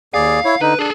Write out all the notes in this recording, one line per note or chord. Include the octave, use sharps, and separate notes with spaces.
D#2 G#4 D5 F5
E4 C#5
D3 D#4 B4
D4 G#4 A4